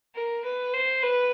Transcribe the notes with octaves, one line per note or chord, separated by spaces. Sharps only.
A#4
B4
C5
B4